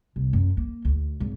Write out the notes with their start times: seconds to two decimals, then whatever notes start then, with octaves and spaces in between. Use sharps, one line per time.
0.16 C2
0.33 F#2
0.57 A#3
0.85 D2
1.20 G#1